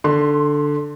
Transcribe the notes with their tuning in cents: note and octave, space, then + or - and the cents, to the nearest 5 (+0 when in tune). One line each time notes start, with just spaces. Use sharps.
D3 +0 C6 +10